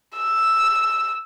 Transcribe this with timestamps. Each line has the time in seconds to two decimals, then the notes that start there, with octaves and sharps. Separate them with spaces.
0.18 E6